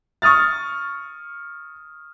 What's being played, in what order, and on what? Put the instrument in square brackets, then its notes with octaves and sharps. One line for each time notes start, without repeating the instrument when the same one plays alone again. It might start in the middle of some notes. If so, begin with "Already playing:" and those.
[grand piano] C#6 D#6 F6 A6